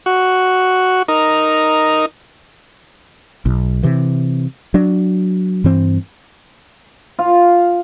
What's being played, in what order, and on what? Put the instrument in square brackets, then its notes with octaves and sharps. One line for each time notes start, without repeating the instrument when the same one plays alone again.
[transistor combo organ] F#4
D#4 A#4
[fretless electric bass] B1
C3 E3
F#3 D4
G2 E3 C4
[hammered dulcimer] F4 F5